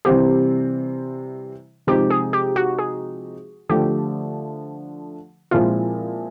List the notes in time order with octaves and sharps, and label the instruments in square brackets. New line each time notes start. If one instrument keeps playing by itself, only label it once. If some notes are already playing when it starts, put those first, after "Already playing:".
[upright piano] C3 E3 G3 C4 [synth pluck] G4
[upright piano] C3 F3 G#3 C4 D#4 [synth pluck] G4
[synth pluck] G#4
G4
F#4
G#4
[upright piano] D3 F3 A3 [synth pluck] G4
[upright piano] A#2 F3 G#3 C4 E4 [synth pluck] F4